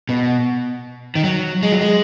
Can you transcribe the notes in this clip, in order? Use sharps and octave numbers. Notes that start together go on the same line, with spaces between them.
B2
D#3
F#3
G#3
F#3
G#3